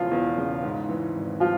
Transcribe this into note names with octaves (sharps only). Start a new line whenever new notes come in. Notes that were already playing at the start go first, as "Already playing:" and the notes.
Already playing: E1 E2 C#3 E3 F3 F4
E2
C#3
G#2
E3
G#1
F3 G3 F4